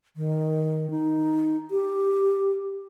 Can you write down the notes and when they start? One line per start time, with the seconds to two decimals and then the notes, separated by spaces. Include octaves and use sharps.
0.16 D#3
0.90 D#4
1.71 G4